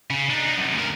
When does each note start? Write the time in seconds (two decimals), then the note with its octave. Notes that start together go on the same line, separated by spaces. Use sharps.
0.10 C#3
0.30 D4 D#4
0.58 F#2 C3
0.75 D2 A#4